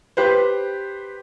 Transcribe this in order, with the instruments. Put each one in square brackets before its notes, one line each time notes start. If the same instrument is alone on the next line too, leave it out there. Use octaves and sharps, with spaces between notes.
[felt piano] G4 B4 C5